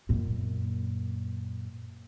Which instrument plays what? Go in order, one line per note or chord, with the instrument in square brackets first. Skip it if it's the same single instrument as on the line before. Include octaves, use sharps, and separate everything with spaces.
[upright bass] F#2 A#2